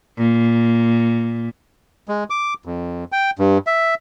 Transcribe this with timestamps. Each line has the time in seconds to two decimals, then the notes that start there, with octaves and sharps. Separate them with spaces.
0.18 A#2
2.08 G#3
2.30 D6
2.65 F2
3.12 G5
3.39 G2
3.67 E5